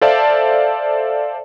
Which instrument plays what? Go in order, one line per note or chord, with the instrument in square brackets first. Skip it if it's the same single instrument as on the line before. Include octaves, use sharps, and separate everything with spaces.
[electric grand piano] A4 C5 D5 E5 F5 A5